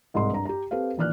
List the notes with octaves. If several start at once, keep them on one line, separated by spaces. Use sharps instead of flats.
C2 G#2 D#5 C6
G2 A#5
G4 A#5
C4 G4 A4 B4 F5
A#1 D#3 E3 D5 F6 F#6